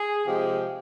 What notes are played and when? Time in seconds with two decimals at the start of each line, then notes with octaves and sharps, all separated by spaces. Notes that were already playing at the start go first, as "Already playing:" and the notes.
Already playing: G#4
0.26 C3 F3 G#3 G4